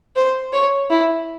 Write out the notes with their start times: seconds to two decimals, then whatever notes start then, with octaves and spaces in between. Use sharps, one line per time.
0.16 C5
0.53 C#5
0.91 E4